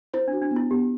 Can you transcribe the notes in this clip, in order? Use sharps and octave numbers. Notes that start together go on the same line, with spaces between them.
E4 C5
D4
F#4
D4
B3
E4
B3 G4